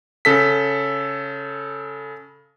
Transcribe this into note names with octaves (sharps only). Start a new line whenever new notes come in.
C#3 A4 B6